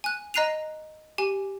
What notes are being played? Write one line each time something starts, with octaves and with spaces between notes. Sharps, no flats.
G#5 F#6
D#5 A#5 F#6 C7 D#7 F7
G4 G#5